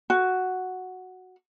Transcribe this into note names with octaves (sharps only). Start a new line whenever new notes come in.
F#4